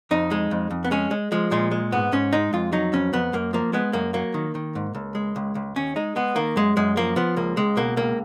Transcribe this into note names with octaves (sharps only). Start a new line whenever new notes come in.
F2 D#4
G#3
F2
F2
B3
G#3 C#4
G#3
F3 G#3
A#2 G#3
G#3
G#2 B3
G#2 C#4
G#3 D#4
F2 F4
F#3 D#4
F2 C#4
F2 B3
F#2 A#3
F3 A#3
G#3 B3
F#2 A#3
F#3 A#3
D#3
D#3
G#2
C#2
G#3
C#2
C#2
D#2 C#4
G#3 D#4
G#3 B3
D#3 A#3
F#2 G#3
F#2 G#3
F3 A#3
F3 B3
C#2 A#3
C#2 G#3
B2 A#3
C#2 A#3